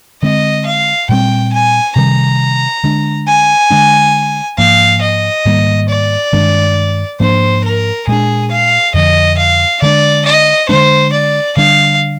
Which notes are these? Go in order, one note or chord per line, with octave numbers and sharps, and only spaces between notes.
D3 G#3 C4 D#5
F5
A#2 G3 C4 G5
G#5
C3 D#3 G3 A#5
D3 G#3 D4
G#5
D3 G#3 D4
G#2 F3 A#3 F5
D#5
G#2 D#3 G3 A#3
D5
G2 D#3 G#3 D4
G#2 F3 A#3 D4 C5
A#4
A#2 G#3 D4 G#4
F5
F2 D3 F3 D#5
F5
D3 G#3 D4 D5
D#5
D3 F3 G#3 D4 C5
D5
D3 G3 D4 F5